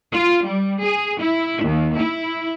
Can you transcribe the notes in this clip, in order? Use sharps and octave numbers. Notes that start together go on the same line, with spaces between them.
F4
G3
G#4
E4
D#2
E4